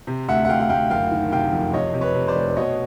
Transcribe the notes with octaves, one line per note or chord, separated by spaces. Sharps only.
C3
D2 E5 F#5
F#5
D2 F5 G5
F#5
D2 F5 G5
F#1 F5 G5
D#3
C3 F5 G5
F2
C3 C#5 D#5
C3
B4 C#5
C3
C5 D5
F1
B2 C#5 D#5